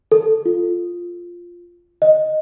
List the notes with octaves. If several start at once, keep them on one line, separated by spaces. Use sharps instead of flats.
A4
F4
D#5